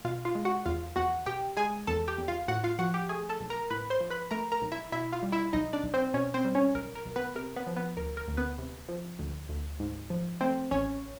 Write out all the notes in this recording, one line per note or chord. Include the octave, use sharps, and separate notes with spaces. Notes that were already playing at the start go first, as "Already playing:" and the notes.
B2 F4 F5
F4 F5
G#3
F#4 F#5
E2 F4 F5
E2 F#4 F#5
B2 G4 G5
G#3 G#4 G#5
E2 A4 A5
G4 G5
E2
F4 F5
A2 F#4 F#5
F4 F5
F3 F#4 F#5
G4 G5
A3 G#4 G#5
A4 A5
B1
A#4 A#5
A2 B4 B5
C5 C6
F3
B4 B5
A3 A#4 A#5
A#4 A#5
B1
E4 E5
B2 E4 E5
F4 F5
G3
E4 E5
B1 D#4 D#5
D4 D5
B1
C4 C5
B2 C#4 C#5
C4 C5
G3
C#4 C#5
B1 A#4
A#4
B1
B3 B4
C3 A#4
B3 B4
F3
B3 B4
D2 A#4
A#4
D2
B3 B4
C3
F3
D2
D2
G#2
F3
A3 C4 C5
A1 C#4 C#5